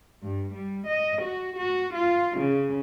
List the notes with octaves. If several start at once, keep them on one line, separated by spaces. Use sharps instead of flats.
G2
G3
D#5
F#4
F#4
F4
C#3